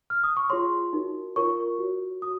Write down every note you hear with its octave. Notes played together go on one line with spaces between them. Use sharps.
F6
D#6
C#6
F4 G#4 C#5 C6
D#4 F#4 A#4
F4 A#4 C#5 C#6
F#4 C#5
F#4 D#6